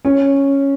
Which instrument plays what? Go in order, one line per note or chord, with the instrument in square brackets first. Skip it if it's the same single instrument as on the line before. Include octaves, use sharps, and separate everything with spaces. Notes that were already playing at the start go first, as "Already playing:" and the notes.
[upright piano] C#4